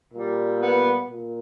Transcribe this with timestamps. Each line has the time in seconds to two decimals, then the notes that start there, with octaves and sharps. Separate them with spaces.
0.12 A#2 G3
0.61 B3
1.09 A#2